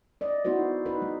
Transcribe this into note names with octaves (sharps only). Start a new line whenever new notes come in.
D5 D#5
B3 D#4 E4 F#4 C5
D#4 B4
G#3